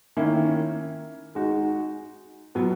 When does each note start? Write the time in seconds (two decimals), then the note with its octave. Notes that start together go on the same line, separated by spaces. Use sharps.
0.17 D#3 A#3 C#4 E4
1.35 G#3 D#4 F#4
2.55 B2 F#3 B3